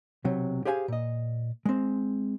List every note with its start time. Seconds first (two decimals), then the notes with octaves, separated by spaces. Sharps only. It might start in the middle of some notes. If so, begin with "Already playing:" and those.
0.25 B1 C3 F#3
0.65 G4 G#4 C5 F5 G#5
0.88 A#2 D#5
1.66 G#3 C4